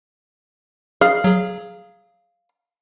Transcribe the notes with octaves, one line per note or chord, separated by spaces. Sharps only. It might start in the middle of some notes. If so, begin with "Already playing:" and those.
G#4 F5
F#3 G#4